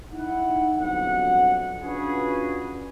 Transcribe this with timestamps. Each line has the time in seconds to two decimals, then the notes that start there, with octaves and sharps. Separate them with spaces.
0.12 D#4 E4 F#5
0.75 G1 F2 F#3 F#5
1.80 C#4 D4 F4 F#4 G#4 B4